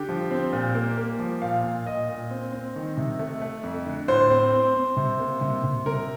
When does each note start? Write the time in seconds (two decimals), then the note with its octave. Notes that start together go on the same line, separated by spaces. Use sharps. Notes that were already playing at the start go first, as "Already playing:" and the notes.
Already playing: D3 G4
0.09 F3
0.30 C4
0.53 A#2
0.75 A#3
0.97 A#3
1.19 F3
1.42 A#2 F5
1.64 A#2
1.86 A#2 D#5
2.09 A#2
2.31 C4
2.53 C4
2.75 D#3
2.97 C3
3.19 A3
3.42 A3
3.63 F2
3.86 D3
4.08 A2 C5
4.30 C4
4.53 C4
4.75 C4
4.97 C3
5.20 A#3
5.41 C3
5.64 C3
5.86 C3 A#4